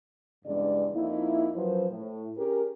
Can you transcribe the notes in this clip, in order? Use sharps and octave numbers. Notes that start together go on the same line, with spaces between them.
E2 G2 C#3 G#3 D4 D5
F2 A#3 D#4 E4
F#2 F3 F#3 B4 C5
A2
C#4 G4 G#4 A#4